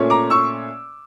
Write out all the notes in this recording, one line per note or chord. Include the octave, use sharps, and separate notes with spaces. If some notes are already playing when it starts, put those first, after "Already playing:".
Already playing: A#2 A3 C#4
A#5 D6
C#6 E6